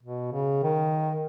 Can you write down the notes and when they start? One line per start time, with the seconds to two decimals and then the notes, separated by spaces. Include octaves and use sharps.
0.03 B2
0.33 C#3
0.63 D#3